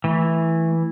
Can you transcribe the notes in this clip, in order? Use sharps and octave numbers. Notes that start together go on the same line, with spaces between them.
E3 A3